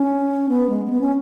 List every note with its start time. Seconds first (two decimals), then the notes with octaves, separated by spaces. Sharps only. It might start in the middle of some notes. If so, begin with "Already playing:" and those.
Already playing: C#4
0.49 B3
0.70 G#3
0.85 G#3
0.90 B3
1.01 C#4